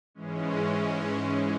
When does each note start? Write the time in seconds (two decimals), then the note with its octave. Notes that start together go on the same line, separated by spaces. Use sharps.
0.14 G#2 E3 G#3 C#4